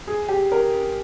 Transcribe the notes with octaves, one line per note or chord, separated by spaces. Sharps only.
G#4
G4
A#4